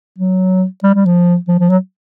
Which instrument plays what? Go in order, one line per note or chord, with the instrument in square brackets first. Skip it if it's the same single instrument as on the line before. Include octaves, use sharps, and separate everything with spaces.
[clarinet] F#3
G3
G3
F3
F3
F3
F#3